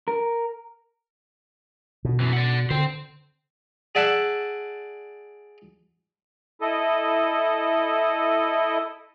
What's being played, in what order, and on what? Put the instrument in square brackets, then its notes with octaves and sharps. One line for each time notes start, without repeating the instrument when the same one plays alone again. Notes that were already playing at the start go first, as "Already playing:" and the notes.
[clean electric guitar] A#4
[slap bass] B2
[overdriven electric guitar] F#2 E3
D5 F#5
[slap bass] D3 [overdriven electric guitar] C5 G5
[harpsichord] G#4 D5 E5 F#5 A5
[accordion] E4 A4 D#5